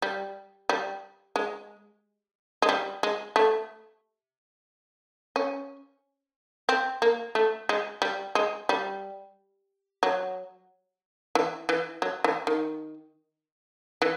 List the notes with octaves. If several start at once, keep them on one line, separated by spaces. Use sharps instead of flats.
G3
G3
G#3
G#3
G3
G#3
A3
C#4
C4
A#3
A3
G#3
G3
G#3
G3
F#3
E3
E3
F#3
E3
D#3
E3